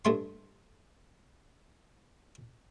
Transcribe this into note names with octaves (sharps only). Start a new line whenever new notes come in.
G2 A3 C6